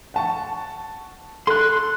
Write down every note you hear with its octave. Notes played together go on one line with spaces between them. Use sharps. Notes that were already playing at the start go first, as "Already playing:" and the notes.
F#5 A5 C#6
A4 C6 F#6